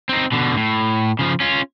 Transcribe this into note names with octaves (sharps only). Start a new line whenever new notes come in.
C4 D#4
B2 D3
A2
C#3 F3
C#4 F4